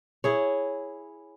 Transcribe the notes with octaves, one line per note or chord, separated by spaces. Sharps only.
E4 G#4 C#5